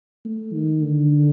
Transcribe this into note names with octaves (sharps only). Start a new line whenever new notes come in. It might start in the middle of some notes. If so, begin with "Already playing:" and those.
A3
D#3
D3